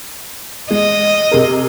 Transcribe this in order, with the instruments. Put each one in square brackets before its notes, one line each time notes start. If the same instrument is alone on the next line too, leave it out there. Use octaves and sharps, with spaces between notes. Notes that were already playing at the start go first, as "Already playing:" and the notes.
[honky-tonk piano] G#3 [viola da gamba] D#5
[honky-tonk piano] C3 G#4 A#4